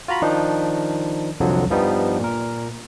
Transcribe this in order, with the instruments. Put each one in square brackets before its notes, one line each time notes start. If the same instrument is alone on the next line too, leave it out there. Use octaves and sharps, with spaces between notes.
[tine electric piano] F4 F#4 A#5 B5
D#3 F3 D4 D#4
C2 F2 D3 F3 F#3
G2 F3 G3 B3 D#4
A#2 A#4